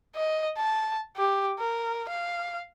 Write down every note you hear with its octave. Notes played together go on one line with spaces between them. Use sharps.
D#5
A5
G4
A#4
F5